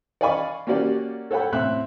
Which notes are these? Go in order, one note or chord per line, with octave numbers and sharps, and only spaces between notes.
D5 D#5 F5 G#5 B5 C#6
A#3 C#4 F#4 G4 D5
A4 C#5 F#5 G5 B5
A2 C4 E5 F#6